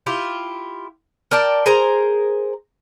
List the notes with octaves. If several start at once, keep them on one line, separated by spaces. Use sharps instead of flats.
E4 F4 G4
A#4 D5 G5 A5
G#4 A#4 C5 A#5